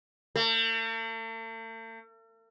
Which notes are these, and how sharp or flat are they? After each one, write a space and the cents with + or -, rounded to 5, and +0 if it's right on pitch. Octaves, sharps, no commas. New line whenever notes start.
A3 +45